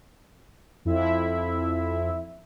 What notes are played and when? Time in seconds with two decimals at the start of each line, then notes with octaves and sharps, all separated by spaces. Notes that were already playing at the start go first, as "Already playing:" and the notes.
0.85 F2 E4 E5